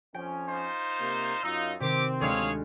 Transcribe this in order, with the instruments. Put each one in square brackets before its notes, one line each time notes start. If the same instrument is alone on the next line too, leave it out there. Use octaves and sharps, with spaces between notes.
[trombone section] F2 F3 C#4 [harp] G5
[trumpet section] D#4 F4 C5
[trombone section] C3 A#3
[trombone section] F#2 F4 [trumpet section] D#4 [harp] E6
[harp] C3 D#3 C7 [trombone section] C4 [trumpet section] G4 D6
[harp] D2 G#3 [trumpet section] G#4 C#5 F5